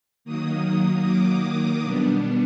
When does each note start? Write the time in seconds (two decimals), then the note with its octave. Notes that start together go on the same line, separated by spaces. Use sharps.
0.25 D#3 F#3 A#3 D#6
1.05 D6
1.44 D#6
1.83 B2 G3 B3 D4